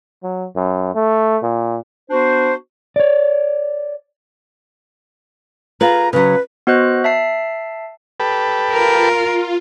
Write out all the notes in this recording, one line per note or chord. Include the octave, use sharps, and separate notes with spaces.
F#3
F#2
A3
A#2
B3 D4 F#4 C5
C#5 D5
F4 G#4 B4 A#5
C#3 F#3 B4
B3 F#4 C5 D#5 F#6
E5 A5 C7
G4 A4 B4
F4 A#4